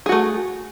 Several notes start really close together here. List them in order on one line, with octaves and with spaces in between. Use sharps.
G#4 F#4 A3